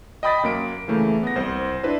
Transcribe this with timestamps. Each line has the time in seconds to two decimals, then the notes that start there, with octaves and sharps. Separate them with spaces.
0.23 D#5 G5 B5 D#6 A6 B6
0.43 F#2 A#3 D7
0.88 C#3 E3 A3 A#3
1.23 B3 A#6
1.36 C2 C5
1.83 D4 E4 B4 C5